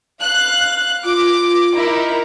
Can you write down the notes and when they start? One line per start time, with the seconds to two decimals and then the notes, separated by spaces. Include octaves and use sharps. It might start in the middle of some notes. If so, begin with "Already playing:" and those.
0.21 F5 F#6
1.05 F4 D6
1.75 D#4 E4 A#4